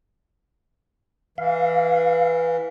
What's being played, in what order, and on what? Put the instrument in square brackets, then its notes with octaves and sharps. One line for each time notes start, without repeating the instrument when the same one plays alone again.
[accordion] E3 [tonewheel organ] F5